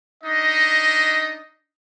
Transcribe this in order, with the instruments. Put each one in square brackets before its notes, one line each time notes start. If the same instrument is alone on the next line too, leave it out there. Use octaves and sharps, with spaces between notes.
[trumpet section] D4 D#4 D#5